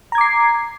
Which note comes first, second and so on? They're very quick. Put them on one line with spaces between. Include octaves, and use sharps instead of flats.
A#5 G#6 D6 C7